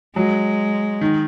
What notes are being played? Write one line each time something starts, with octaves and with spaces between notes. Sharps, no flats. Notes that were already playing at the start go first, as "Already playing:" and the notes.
F#3 G#3
D#3